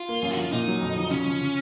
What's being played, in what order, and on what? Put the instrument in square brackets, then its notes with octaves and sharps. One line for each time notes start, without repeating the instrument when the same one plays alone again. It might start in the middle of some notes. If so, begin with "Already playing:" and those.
Already playing: [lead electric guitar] F4
[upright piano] A#3
F#2
[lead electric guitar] F#4
[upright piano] F3
[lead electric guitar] F4
[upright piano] A#2 [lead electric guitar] D#4
[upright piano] F#3
F2
F3
[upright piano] C#3 [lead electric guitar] C#4
[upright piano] F3
C#3